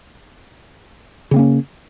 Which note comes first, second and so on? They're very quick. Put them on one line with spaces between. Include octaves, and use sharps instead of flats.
C#3 C4 A#3 C#4